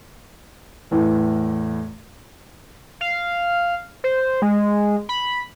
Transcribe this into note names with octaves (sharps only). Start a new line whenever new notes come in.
E2 A2
F5
C5
G#3
B5